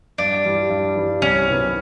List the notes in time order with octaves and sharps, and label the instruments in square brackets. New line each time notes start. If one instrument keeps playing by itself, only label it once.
[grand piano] G2 [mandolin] D4
[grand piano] E3 G3
G2
E3 G3
[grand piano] C2 [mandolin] C#4
[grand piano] C3 D#3 F#3 B3